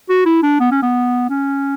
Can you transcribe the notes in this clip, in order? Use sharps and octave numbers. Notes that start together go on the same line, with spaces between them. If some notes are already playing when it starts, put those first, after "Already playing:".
F#4
E4
D4
B3
C#4
B3
C#4